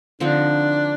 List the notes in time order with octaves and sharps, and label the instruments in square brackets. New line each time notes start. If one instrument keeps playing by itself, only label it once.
[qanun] D3 F3 C4 D#4 [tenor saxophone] D4